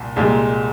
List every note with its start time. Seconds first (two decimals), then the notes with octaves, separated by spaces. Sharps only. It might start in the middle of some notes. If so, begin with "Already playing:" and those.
Already playing: C2 A#2
0.16 C2 A#2 G#3